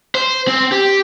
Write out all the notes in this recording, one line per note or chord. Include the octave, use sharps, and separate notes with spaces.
C5
C4
G4